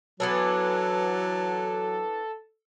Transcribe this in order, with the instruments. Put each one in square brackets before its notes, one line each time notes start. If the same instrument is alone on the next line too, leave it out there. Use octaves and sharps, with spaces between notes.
[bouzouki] E3 B3 D4 [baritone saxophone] F#3 [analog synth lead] A4